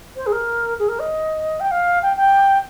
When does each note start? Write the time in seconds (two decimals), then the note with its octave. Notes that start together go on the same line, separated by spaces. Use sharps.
0.16 C5
0.26 G#4
0.32 A#4
0.79 G#4
0.88 A#4
0.99 D#5
1.60 G5
1.71 F5
2.02 G5
2.16 G5